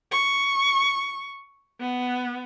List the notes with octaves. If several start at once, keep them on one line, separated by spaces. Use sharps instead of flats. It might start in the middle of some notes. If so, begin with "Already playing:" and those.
C#6
B3